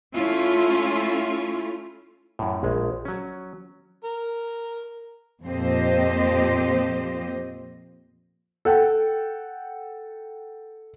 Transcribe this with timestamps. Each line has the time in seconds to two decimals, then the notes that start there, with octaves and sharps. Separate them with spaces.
0.14 A3 C#4 E4 F4
2.39 F#2 A2
2.63 A#1 G#3
3.05 F#3 C#4
4.04 A#4
5.44 F2 A#2 C4 G4 C5 D#5
8.65 A4 F#5 G5